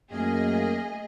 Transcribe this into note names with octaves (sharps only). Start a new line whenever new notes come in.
F#2 A3 A#3 G#4 D#5